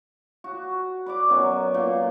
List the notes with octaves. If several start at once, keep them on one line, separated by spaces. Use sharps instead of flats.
F#4
B4 D5 D6
F#2 B2 F#3 G#5
A#2